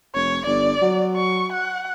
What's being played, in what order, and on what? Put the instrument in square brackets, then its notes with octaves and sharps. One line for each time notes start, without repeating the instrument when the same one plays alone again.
[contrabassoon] F1 [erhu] C#5
[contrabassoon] G1 [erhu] D5
[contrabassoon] F#3
[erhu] C#6
F#5